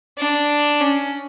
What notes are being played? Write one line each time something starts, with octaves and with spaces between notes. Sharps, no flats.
D4
C#4